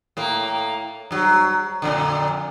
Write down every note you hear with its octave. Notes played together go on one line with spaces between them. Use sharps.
A2 A#3
G2 F#3
F2 A#2 D3